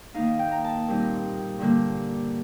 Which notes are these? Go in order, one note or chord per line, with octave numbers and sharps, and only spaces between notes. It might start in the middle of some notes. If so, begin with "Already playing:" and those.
D#3 A#3 D#4 F5
G5
A#5
A5
A#2 G3 C4 D#4
G2 D3 G3 A#3